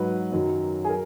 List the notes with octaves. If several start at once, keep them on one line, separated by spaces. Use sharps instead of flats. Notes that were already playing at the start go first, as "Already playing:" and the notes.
Already playing: G#2 F#3 B4
F#2 D#3 F#3
G#4
A#4